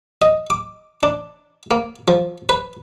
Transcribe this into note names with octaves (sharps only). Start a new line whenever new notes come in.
D#5
D6
D4
A#3
F3
B4